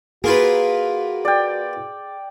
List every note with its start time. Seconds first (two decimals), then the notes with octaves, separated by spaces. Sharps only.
0.24 A#3 F4 F#4 G#4 B4
1.25 D5 G5